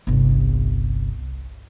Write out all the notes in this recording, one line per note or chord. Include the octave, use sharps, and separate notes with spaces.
G1 C2